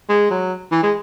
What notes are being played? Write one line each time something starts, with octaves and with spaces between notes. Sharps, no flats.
G#3
F#3
E3
G#3